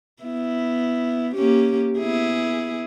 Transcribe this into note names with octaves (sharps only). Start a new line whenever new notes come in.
B3 E4
A#3 C#4 G4
B3 E4 G#4